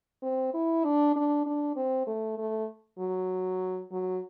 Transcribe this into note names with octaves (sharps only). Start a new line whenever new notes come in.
C4
E4
D4
D4
D4
C4
A3
A3
F#3
F#3